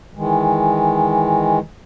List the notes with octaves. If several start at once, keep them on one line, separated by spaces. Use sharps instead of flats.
D#3 E3 G#3